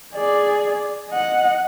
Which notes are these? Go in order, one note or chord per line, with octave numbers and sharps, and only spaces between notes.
G#4 D5
D#5 F#5